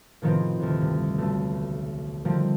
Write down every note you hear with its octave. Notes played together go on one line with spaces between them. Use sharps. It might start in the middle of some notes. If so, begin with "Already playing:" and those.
A2 C3 D#3 F3 B3 C4
D2 C3
G2
B1 A3
D3 D#3 F3 G3 A3 C4